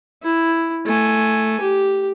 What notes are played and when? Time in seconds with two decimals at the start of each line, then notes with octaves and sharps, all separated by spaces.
0.23 E4
0.86 A3 G#5
1.61 G4